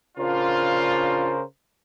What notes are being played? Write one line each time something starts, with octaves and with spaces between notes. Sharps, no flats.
C#3 D4 F4 A#4 C5